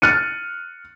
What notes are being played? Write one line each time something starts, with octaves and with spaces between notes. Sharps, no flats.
F6 F#6 A6 C#7 D#7